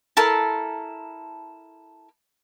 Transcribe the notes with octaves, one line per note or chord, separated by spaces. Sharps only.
E4 A4 A#4 A5